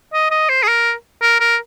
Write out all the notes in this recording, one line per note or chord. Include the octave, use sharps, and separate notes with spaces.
D#5
D#5
C5
G#4
A#4
A#4
A#4